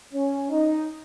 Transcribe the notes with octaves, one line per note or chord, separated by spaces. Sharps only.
C#4
D#4